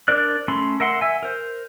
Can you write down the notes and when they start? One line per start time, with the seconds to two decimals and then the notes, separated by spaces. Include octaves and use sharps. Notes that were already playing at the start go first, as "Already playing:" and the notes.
0.08 D4 A#4 C5 D5 F#6
0.48 A3 C#4 B5 C6
0.80 A#4 E5 F#5 C6
1.01 E5 G#5
1.23 A#4 C5